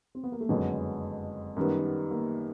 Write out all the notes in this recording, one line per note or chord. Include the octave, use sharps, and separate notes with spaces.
C4
B3
A#3
A3
F#1 F2 D3 F#3 G#3 B3
F#2 D#3 G3 B3
A#3